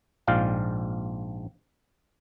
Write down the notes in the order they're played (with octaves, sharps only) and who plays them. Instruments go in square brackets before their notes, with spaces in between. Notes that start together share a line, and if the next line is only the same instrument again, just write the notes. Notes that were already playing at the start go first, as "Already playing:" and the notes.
[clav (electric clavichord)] A#1 G#2 F4 D5 F5 G5